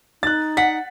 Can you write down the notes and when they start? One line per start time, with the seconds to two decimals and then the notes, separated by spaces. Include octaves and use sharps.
0.23 D#4 F#6 A6
0.57 F#5 B6